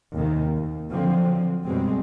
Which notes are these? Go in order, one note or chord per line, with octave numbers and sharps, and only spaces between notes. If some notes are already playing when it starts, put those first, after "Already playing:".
D#2 C3 D#3
D#2
D3 F3 F#3 C4
F#2 B2 G3 G#3 C4